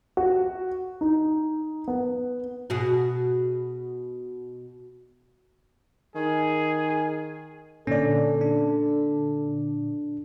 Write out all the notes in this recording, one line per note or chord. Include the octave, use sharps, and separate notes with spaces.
F#4
D#4
B3
B2 F#4 G#4
D#3 G#4
A#2 D3 C#4 A4 D5
D4